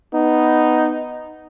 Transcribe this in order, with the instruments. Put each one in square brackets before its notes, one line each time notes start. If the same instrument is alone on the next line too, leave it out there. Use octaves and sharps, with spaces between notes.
[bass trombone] B3 [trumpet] D#4